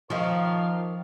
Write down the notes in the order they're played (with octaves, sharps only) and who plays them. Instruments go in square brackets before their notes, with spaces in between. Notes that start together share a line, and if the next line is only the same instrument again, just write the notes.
[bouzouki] D#3 G4 [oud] F3 [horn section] A#4 C#5 F5